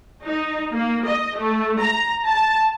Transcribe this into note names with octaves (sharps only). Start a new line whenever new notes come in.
D#4
A#3
D#5
A3
A#5
A5